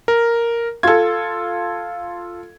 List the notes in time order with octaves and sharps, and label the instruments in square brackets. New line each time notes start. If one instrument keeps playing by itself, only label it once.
[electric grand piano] A#4
[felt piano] F4 A4 [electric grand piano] G#6